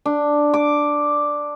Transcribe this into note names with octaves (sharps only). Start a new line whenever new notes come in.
D4
D6